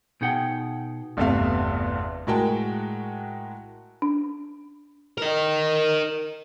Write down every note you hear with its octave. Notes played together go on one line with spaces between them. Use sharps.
B2 D#4 G#4 F#5 G5
G1 E2 C3 A3 E5 F5
A2 G#3 F#4 A#4 G5 A5
D4
A#4 D#5